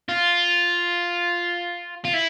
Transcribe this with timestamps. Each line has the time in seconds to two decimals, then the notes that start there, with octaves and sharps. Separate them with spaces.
0.09 F4
2.05 F4
2.14 E4